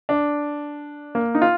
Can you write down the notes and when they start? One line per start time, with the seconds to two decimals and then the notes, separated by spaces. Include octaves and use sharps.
0.09 D4
1.15 A#3
1.35 D#4
1.42 F4